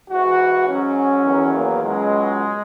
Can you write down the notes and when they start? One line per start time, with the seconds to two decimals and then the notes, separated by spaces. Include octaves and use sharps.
0.10 G#2 E3 F#4
0.67 G#2 F#3 C#4
1.25 E2 D#3 F#3
1.53 A#3
1.82 C#2 B2 F#3 G#3